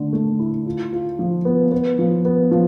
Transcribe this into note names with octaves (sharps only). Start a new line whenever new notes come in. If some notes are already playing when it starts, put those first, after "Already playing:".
Already playing: D3 A3
A3
E4
F4
F4
F3
B3
B3
F3
B3
F3